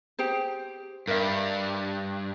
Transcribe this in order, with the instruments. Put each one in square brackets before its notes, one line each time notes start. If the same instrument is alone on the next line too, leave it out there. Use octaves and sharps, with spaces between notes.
[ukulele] G4 G#4 C5
[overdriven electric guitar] G2 [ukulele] A#4 E5